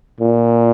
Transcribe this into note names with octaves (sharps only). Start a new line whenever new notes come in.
A#2